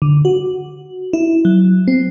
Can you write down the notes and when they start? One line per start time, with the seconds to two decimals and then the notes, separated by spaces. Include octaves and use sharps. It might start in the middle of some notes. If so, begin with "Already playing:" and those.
0.02 D3
0.25 F#4
1.13 E4
1.45 F#3
1.88 C4